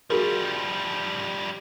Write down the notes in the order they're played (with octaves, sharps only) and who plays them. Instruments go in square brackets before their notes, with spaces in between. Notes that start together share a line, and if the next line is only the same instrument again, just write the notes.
[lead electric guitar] F3 G3 [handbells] F#4 G#4 A#4